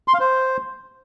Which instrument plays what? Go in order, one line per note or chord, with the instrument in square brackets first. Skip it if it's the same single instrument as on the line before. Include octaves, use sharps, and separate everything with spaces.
[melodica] C6
F5
C5